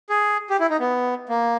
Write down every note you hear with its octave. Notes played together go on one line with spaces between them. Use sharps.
G#4
G4
E4
D#4
B3
A#3